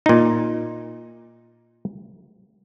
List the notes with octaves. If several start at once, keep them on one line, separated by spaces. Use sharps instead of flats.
A#2 D#4